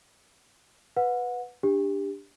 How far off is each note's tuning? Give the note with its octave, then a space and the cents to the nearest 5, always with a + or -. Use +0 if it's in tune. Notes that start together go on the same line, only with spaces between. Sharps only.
B4 +0 F#5 -25
D4 +0 G4 +20